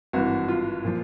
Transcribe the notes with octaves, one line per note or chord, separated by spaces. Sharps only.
G#1 G2 E3 F#4
F4
A#2 F3